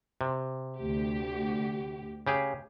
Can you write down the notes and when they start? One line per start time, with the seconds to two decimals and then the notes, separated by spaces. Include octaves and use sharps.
0.21 C3
0.78 D2 G4
2.27 C#3 G4 G#4